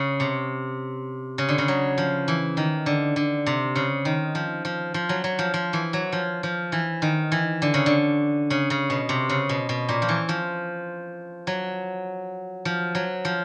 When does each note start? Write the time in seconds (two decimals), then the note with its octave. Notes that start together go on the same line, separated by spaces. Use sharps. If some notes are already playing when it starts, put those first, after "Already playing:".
Already playing: C#3
0.20 C3
1.38 C#3
1.49 D3
1.58 C#3
1.68 F#3
1.98 F3
2.28 E3
2.57 D#3
2.86 D3
3.16 D3
3.46 C3
3.76 C#3
4.05 D#3
4.35 F3
4.65 F3
4.94 F3
5.09 F#3
5.24 F#3
5.39 F3
5.54 F3
5.73 E3
5.93 F#3
6.12 F3
6.43 F3
6.72 E3
7.02 D#3
7.32 E3
7.62 D3
7.74 C#3
7.86 D3
8.50 C#3
8.70 C#3
8.90 B2
9.09 C3
9.29 C#3
9.49 B2
9.69 B2
9.89 A#2
10.02 F3
10.09 E3
10.29 F3
11.47 F#3
12.65 F3
12.95 F#3
13.25 F3